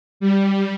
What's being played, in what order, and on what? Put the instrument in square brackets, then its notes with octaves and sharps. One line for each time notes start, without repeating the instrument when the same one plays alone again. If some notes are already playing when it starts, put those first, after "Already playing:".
[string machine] G3